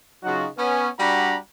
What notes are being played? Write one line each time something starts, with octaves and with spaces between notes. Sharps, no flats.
C#3 F#3 D#4 F4 F#4
B3 C#4
G3 D4 F#4 F#5 A#5 B5